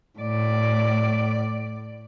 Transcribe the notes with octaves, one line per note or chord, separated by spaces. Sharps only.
A2 D5